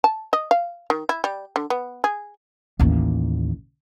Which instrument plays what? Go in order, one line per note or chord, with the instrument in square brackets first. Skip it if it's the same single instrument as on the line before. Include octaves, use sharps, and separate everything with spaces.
[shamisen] A5
D#5
F5
D#3
E4
G3
D3
B3
G#4
[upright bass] A1 D#2